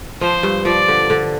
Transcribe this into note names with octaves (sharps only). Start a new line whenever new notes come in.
F3 C5
G2
F3 D5
D3
D3